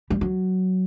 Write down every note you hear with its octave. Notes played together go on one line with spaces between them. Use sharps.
G3
F#3